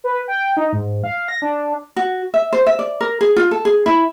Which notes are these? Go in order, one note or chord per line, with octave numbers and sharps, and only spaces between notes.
B4
G5
D#4
G#2
F5
A#6
D4
F#4
E5
C5
E5
D5
A#4
G#4
F4
A4
G#4
E4